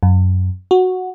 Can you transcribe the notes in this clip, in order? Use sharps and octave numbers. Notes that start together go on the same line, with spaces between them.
F#2
F#4